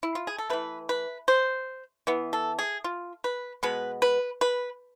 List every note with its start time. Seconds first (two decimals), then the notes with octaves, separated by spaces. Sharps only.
0.03 E4
0.15 F4
0.27 G#4
0.38 A4
0.50 E3 A3 B4
0.89 B4
1.28 C5
2.07 E3 B3
2.33 A4
2.59 G#4
2.84 F4
3.24 B4
3.63 B2 G#3 B3 B4
4.02 B4
4.41 B4